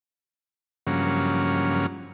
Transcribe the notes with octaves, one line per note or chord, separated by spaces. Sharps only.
G2 C#3 F3 F#3 A#3 C#4